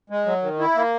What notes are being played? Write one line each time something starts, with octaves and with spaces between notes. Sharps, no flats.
G#3
F#3
D#3
E4
A#3